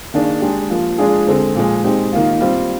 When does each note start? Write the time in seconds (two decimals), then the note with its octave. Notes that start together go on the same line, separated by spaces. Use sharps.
0.14 D#3 A#3 D4 G#4
0.41 G#3 D4 G4
0.70 F3 A#3 F4
0.98 F3 G#3 D4 F4 G#4
1.27 D3 G#3 C4
1.55 A#2 F3 G#3
1.84 G#3 C4 D#4 G4
2.13 D#3 A#3 F4
2.41 G3 C4 F4